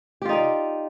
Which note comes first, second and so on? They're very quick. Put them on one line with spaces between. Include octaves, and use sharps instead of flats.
G4 F4 D#4 D5